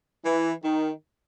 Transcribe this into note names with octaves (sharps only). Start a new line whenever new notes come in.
E3
D#3